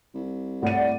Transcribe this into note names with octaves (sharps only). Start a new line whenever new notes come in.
C2
A2 D5 F#5 D#7